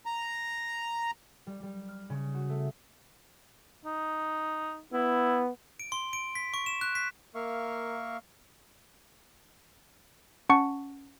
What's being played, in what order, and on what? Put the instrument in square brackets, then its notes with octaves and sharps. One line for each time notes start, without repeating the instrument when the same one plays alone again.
[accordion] A#5
[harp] G3
G3
F6
C#3
F#4
A3
[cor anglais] D#4
[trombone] B3 [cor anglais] E4
[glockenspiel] D7
C6
D7
B6
C#6
E7
F#6
B6
[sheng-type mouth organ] A#3 A#4 E5 F5 C#6
[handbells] C#4 F#5 A5 C#6 C#7